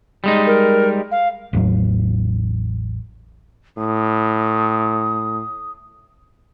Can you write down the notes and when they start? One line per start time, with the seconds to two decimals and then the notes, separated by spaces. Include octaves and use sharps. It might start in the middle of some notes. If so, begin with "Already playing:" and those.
0.24 G3 G#3 D#4
0.47 A#4
1.11 F5
1.53 A1 E2 A2 F#3
3.78 A2 D#6